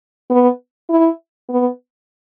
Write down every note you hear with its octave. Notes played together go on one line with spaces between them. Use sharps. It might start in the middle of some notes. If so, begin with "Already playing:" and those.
B3
E4
B3